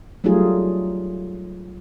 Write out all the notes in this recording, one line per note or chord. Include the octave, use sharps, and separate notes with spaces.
F#3 G3 A3 D#4 F4 G#4